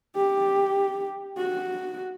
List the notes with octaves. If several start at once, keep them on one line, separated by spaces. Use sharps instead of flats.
G4
F#4